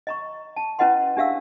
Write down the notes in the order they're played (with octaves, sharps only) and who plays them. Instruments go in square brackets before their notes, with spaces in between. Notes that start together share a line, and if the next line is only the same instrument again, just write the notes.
[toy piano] D#5 A#5 C#6
A5
C#4 E4 B4 D#5 F#5 C6
D4 G4 E5 F5 E6